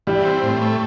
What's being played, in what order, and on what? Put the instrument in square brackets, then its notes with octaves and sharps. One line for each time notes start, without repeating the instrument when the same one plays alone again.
[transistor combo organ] E3 [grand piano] G3
[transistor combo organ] C4
A2
A3